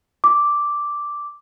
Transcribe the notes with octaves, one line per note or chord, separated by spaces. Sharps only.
D6